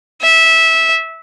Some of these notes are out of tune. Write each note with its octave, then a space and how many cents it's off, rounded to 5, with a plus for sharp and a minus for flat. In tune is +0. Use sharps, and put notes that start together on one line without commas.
E5 -15